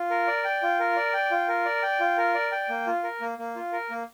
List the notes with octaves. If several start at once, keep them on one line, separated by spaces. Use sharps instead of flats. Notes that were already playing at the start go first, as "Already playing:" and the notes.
Already playing: F4
A#4
D5
G5
F4
A#4
D5
G5
F4
A#4
D5
G5
F4
A#4
D5
G5
A#3
F4
A#4
A#3
A#3
F4
A#4
A#3